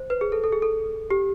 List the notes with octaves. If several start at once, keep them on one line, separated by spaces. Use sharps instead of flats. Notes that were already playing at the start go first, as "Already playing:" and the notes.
Already playing: C5
B4
G#4
A4
A4
G#4
A4
G4